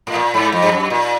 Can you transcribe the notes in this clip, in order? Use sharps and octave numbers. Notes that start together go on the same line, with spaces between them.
A2
A#2
G#2
F2
G2
F#2
A#2